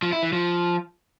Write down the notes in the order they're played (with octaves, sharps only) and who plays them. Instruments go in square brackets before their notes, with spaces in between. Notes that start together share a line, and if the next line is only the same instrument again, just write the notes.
[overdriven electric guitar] F3
E4
E3
F3